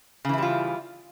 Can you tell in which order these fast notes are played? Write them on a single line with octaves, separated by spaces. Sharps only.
C#3 E3 E4 G3 F4